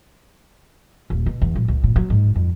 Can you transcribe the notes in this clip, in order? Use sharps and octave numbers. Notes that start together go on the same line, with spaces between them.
D#1
B2
E2
A#1
C#2
A#2
F#3
G#2
F2